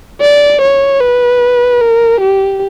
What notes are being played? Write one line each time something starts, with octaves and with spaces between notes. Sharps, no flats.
D5
C#5
B4
A#4
G4